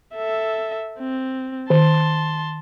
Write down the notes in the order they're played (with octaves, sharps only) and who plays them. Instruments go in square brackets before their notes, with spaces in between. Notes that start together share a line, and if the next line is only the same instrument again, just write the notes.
[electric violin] A4 E5
C4
[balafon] D#3 [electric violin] A5 C6